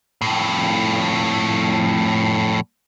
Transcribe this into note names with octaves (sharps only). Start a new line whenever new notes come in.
F2 A2